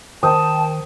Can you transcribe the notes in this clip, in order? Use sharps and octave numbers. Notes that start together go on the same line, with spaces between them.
D#3 A#4 C5 G5 A5 D#6